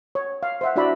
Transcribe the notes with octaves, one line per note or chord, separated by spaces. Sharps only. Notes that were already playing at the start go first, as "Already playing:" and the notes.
C#5
F5
C5 E5 F#5
D4 E4 F#4 D5 E5 B5